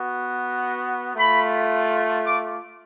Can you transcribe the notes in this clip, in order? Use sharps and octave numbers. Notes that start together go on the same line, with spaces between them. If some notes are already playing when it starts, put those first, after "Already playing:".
Already playing: B3 F#4
A3 F4 B5
D6